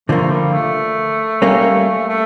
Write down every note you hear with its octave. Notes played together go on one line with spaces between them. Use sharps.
D3 F3 A3 A#3
G3
A3
G3 A#3 C#4
A3